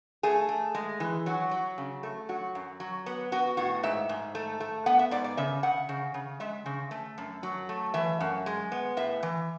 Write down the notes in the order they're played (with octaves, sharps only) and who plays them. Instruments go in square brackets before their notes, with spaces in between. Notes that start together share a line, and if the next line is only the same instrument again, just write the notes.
[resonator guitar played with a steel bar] A3 G#4
A3
G#3
E3
F#3 F#4
F#3
C#3
A3
F#3 F#4
F#2
F#3
B3
B3 F#4
A2 F#4
G#2 E5
G#2
A3
A3
B3 F#5
E5
G#2 D5
D5
C#3 E5
C#3 F#5
C#3
C#3
G#3 E5
C#3
A3
F#2
F#3
A3
E3 E5
F#2
G#3
B3
A2 E5
E3